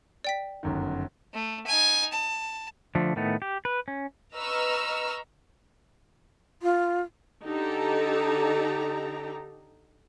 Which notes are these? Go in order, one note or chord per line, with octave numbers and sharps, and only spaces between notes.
D5 G5 B6
G1 F#2 D#3
A3
D#4 G#5
A5
D3 F3 A3
A2 D#3 A3 B3
G4
B4
C#4
B4 D#5 A#5 C#6 E6 F6
F4
D3 D#4 G4 A4 A#5